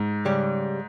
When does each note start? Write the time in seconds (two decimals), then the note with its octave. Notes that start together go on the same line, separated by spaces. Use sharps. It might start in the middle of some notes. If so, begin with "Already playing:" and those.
Already playing: G#2
0.25 C#3 G3 C#4 G4